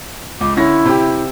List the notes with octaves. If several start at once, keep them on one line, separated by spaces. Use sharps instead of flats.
C#2 D6
D3 C#4 E4 A#6
C3 G4